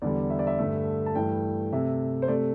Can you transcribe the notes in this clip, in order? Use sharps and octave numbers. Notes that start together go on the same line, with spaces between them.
E2 D3 G3 D5
E5
D5
E5
G2 D3 A3
A5
G2 E3 A3 G5
C3 A3 E5
C5
C3 A3 D5